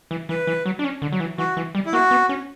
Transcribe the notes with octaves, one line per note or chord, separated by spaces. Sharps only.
E3
E3 B4
E3
F#3
D4
C#4
D3
F#3
E3
E3 F#4
E3
G3
E4
A#3 F#4
B3
C#4